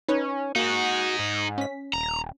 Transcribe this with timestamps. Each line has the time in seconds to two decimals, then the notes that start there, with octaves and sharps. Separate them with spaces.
0.08 C#4 D#4 B4 C#5
0.56 A#3 D#4 F#4 G#4
1.19 G#2
1.58 C#4 B6
1.93 D#1 A#5